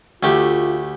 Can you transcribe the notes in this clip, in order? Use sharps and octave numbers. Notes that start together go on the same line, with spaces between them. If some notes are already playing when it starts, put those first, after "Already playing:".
D2 A3 F4 G4